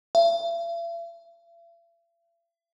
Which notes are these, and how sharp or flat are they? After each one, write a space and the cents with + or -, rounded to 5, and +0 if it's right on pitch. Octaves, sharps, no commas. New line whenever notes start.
E5 +45